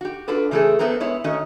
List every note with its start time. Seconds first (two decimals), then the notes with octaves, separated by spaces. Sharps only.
0.01 F#4 G4
0.28 D4 F4 F#4 A4 B4
0.51 C#3 E3 A3 C4 G#4 A4
0.79 A3 B3 C4 A4 A#4
1.00 G#3 B3 E4 C#5
1.24 D#3 A3 C#4 F#4 D#5